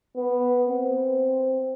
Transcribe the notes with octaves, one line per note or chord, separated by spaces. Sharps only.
B3
C4